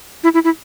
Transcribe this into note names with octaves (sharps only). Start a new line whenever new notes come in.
E4
E4
E4